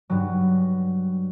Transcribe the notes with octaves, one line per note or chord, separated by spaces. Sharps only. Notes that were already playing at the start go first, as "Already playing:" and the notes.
G2 F#3